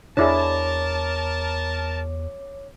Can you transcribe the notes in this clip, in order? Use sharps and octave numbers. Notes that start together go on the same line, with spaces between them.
E2 D4 E4 G#4 A#4 C#5 A5 D6